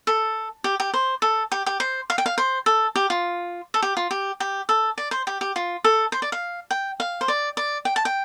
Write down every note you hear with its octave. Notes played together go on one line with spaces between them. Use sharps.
A4
G4
G4
C5
A4
G4
G4
C5
F5
G5
F5
C5
A4
G4
F4
A4
G4
F4
G4
G4
A4
D5
C5
G4
G4
F4
A4
C5
D5
F5
G5
F5
C5
D5
D5
G5
A5
G5